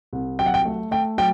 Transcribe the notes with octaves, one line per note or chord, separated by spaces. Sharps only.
C2
F#3 G5
F#5
G5
A3
A3 G5
F#3 G5